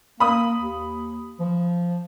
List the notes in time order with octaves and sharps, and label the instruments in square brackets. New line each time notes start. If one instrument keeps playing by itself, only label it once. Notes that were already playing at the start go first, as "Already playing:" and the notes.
[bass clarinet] A#3 [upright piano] B5 D#6
[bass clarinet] D#2
F3